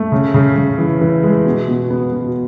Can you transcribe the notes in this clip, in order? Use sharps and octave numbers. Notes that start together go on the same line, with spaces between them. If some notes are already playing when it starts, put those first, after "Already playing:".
Already playing: A3
C#3
C#3
C#3
E3
E3
G#3
B2
B2
B3
B2